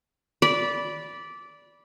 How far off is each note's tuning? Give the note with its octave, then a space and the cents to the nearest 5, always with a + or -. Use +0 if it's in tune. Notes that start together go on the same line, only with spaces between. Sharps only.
D5 -15 B5 -10